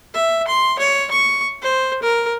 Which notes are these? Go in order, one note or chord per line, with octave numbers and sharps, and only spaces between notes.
E5
C6
C#5
C#6
C5
A#4